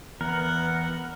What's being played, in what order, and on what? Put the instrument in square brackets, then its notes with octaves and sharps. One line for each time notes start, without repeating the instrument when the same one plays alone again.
[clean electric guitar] E2 [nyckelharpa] B3 F#5 [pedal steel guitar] A#4